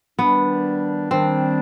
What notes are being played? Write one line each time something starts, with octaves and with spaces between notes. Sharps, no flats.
D#3 G3 B3 D4
D#3 G3 C4 D4